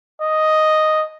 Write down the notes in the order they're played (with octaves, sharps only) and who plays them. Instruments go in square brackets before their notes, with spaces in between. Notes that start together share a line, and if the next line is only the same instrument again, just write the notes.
[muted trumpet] D#5